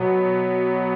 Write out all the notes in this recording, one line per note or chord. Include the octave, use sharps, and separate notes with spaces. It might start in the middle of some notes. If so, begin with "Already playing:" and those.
Already playing: B2 F#3 B3